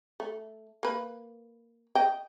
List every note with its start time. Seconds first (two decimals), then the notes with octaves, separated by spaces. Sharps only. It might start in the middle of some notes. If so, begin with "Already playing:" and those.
0.20 A3
0.83 A#3 B4
1.95 D#5 G5